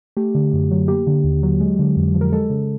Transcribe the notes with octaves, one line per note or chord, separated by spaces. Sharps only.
A3 G4
D3
F#2
F#3
A#3 G4
D3
D#2
F#3
G#3
D3
F2
F3
A#4
G#3 A4
C#3